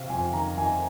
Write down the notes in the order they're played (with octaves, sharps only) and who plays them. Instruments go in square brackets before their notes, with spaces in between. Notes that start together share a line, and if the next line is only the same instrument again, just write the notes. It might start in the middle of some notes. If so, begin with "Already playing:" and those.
Already playing: [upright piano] C3 F5
F2 G#5
D#3 A#5
D#3 G#5